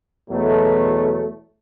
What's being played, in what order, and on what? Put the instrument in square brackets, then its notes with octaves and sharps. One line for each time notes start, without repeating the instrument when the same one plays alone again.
[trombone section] E2 B2 F#3 A3